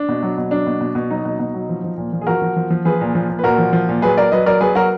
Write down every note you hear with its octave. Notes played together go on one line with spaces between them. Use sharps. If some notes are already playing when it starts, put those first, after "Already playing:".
Already playing: D4
B2
F#3
B2
F#3 D4
B2
B2
B2
F#3 D#4
B2
B2
F#3
F3
F3
A#2
F3
G#4
F3 F#4 A#4
F3
F3
F3
F3 G#4 B4
A#2
F3
A#2
B4
A#2 F#4 A#4
F3
F3
A#2
F#3 G#4 B4
F#3 A#4 D5
F#3 B4 D#5
F#3 A#4 D5
F#3 G#4 B4
F#3 F#4 A#4